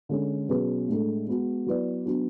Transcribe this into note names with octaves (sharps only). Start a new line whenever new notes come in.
D3 G#3 C#4
B2 F#3 C#4 G#4 B4
A2 G#3 D4 A4
G#3 B3 F#4
F#3 B3 E4 B4 D5
F#3 B3 D4 F#4